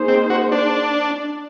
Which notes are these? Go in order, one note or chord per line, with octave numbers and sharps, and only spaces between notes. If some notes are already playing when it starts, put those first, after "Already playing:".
Already playing: A#3 D#4 G#4 C5
C4
F#4
D4